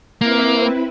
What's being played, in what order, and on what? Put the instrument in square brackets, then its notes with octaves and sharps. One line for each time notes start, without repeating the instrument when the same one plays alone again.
[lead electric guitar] A#3 [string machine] C4 E4 B4